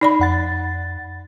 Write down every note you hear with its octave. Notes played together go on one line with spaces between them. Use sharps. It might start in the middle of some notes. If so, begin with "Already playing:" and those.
D#4 D5 B5
F2 F#5 A6